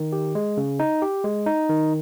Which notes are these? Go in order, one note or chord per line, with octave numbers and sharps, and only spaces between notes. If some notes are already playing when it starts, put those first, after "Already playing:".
Already playing: D#3
G4
G#3
C#3
D#4
G4
G#3
D#4
D#3